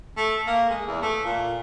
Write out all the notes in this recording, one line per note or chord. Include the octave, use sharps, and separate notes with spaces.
A3
A#3
G#3
E2
A3
A#2